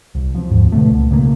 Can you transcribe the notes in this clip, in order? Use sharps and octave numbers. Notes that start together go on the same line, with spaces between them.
C2
F3 C4
D#2 G#2 F3
B2 D3 A3
C#2
B1 C#3 F3 A#3